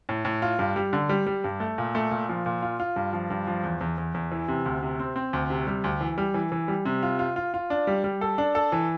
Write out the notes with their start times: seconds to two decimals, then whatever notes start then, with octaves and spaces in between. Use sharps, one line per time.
0.09 A2
0.25 A2
0.42 F4
0.59 G2
0.76 G3
0.93 D3
1.09 G3
1.26 G3
1.44 G2
1.60 A3
1.78 A#2
1.95 A3
2.11 A#2
2.29 F3
2.46 A#2
2.62 F4
2.80 F4
2.96 G2
3.13 F3
3.30 G2
3.47 F3
3.63 E2
3.81 E2
3.98 E2
4.14 E2
4.32 E3
4.48 C3
4.66 D2
4.83 C3
5.00 C4
5.16 C4
5.33 D2
5.50 C3
5.67 G3
5.84 D2
6.01 E3
6.18 G3
6.34 E3
6.52 E3
6.68 G3
6.85 C3
7.03 F4
7.19 F4
7.36 F4
7.54 F4
7.70 D4
7.87 G3
8.04 G3
8.21 A4
8.38 D4
8.55 A4
8.72 E3